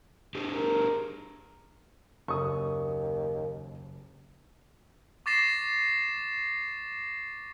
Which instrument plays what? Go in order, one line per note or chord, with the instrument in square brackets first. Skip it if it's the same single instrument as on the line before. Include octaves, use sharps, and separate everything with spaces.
[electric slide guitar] D4 G4 G#4
[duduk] A#4
[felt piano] F#1 [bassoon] D#2 [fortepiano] C#6 D#6
[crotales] C#6 D6 A6 A#6 C7 E7